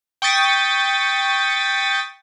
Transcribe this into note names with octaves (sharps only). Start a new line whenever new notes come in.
G5 C#6 D#6 A6 B6